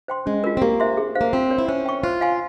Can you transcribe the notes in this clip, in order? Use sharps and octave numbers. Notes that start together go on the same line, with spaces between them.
C5 G5 C6
G#3 C#4
F4 A#4
C4
A#3 G4
C5 E5 G#5 C6
G#4
C5 F5
A#3
C4 F4
A#4 C#5 G5
E4
C#4 C5
G5 C#6
F4 C5
F5 G#5 C6